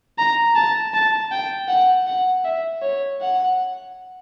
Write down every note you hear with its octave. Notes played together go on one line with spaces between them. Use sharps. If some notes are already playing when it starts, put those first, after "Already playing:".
A#5
A5
A5
G5
F#5
F#5
E5
C#5
F#5